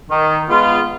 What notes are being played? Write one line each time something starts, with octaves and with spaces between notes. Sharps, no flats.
D#3
G#3 B3 F4